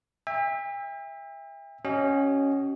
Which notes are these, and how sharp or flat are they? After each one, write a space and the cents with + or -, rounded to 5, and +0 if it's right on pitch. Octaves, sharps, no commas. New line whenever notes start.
E5 -5 G5 +45
C#4 +0 F#4 +45 D#5 +0